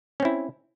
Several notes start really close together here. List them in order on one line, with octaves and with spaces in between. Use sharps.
C#4 C4 E4